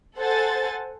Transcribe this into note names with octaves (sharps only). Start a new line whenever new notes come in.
A4 C5 F#5 G#5 A6